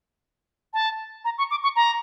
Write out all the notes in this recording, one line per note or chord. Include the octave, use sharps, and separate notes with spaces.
A5
A#5
C#6
D6
C#6
A#5